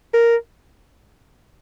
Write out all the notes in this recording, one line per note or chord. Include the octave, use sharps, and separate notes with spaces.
A#4